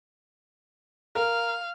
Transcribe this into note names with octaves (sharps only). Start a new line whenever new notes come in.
A#4 F5